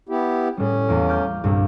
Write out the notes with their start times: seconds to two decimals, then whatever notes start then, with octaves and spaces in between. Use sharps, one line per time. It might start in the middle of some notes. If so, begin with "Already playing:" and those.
0.09 B3 E4 G4
0.57 A2 G3 C#4
0.88 E2 A#3
1.09 D6 F6 G6
1.44 C2 G2 A#2